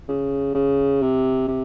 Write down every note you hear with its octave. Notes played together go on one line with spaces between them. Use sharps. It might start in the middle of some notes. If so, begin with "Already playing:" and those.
C#3
C#3
C3
C3